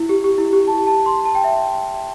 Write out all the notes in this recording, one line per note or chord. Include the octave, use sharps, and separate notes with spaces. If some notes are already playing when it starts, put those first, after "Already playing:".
Already playing: E4
G4
G4
E4
G4
A5
A5
C6
A5
G5
E5